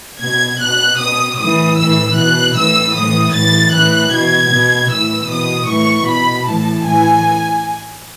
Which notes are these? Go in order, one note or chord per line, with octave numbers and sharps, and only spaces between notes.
B2 G#6
B2 F#6
B2 D#6
A2 E3 D#6
A2 E3 E6
B2 F#6
A2 E3 E6
A2 E3 D#6
A2 E3 A6
A2 E3 F#6
B2 G#6
B2
A2 E3 E6
B2 D#6
A2 E3 C#6
B2 B5
A2 E3 A5
A2 E3 G#5